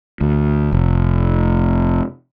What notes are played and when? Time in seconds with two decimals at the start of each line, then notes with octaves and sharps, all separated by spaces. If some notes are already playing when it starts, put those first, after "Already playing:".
0.21 D2
0.72 F1